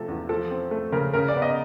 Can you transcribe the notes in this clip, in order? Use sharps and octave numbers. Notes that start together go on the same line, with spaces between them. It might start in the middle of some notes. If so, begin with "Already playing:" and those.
Already playing: C3 F3 A3 A4
E2
F3 A4
C4
A3
C#3 A#4
C#3 A#4
D5
B3
D#5